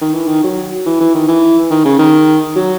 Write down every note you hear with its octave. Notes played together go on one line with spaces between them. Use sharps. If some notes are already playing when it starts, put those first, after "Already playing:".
D#3
E3
D#3
F#3
E3
E3
D#3
E3
D#3
C#3
D#3
F#3